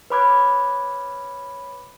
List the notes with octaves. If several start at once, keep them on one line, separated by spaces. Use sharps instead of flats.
B4 C#5 B5 D6 F#6 G#6